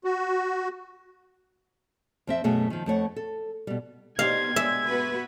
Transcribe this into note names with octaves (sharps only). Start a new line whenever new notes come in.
F#4
F2 C4 E5
F#2 B2 A3 F#4 G#4
D#3 F3
F2 A3 C#5 F#5
A4
B2 G3
B2 D#4 G4 C5 F5 G#6
G#3 E5
B3 F#4 B4